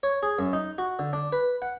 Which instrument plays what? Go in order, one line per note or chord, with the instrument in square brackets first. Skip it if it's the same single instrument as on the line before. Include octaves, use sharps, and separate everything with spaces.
[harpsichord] C#5
G#4
F#2
D#4
F#4
D3
D4
B4
F#5